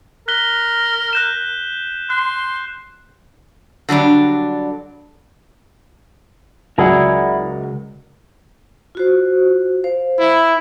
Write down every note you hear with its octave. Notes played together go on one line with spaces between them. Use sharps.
A#4 F#6 B6 G7
F#6 G6 E7
C6 F#6
D3 F#3 G3 D4
C#2 F#3 E4 G#4 A#4 D5 F#5
F4 F#4 C5
C5 F5
E4